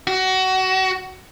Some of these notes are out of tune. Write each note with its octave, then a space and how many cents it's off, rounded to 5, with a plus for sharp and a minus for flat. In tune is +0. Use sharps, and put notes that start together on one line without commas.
F#4 +25